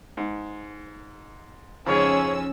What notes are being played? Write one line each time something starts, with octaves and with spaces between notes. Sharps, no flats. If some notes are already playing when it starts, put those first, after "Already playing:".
G#2
F2 G#2 C#3 F3 C#4 G#4 C#5 E6